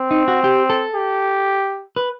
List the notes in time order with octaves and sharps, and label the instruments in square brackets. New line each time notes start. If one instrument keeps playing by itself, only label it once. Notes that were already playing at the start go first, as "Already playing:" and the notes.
Already playing: [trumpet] C4
[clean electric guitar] D#4
F#4
G4
A4
[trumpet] G4
[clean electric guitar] B4